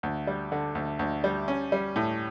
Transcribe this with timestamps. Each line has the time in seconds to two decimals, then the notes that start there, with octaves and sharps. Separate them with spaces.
0.03 D2
0.27 G3
0.52 D3
0.75 D2
0.99 D2
1.24 G3
1.48 C#4
1.72 G3
1.96 A2